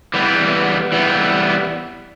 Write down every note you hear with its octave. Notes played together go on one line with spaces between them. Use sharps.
E3 G3 B3
E3 G3 B3